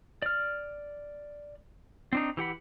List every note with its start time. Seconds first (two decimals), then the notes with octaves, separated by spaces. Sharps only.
0.22 D5 F6
2.13 C4 D4 D#4
2.37 E3 G4 F#5 B5